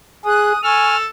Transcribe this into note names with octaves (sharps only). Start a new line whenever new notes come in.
G#4 D#6 F#6
A4 G#5 C#6 F6